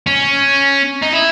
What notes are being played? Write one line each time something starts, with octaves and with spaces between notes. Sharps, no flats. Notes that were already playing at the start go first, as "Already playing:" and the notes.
C#4
D#4
E4